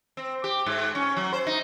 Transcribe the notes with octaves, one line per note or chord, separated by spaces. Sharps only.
C4
G4
G#2
C#4
F#3
C5
D#4